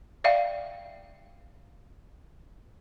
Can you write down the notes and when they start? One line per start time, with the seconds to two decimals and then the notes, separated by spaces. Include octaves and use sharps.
0.24 D5 E5 F5 G5